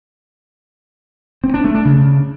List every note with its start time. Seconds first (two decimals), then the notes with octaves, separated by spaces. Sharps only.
1.44 C4
1.54 D4
1.64 A3
1.75 D4
1.85 C#3